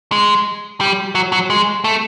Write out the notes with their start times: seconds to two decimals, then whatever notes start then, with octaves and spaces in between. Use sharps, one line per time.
0.12 G#3
0.81 G3
1.15 F#3
1.33 F#3
1.50 G#3
1.84 A3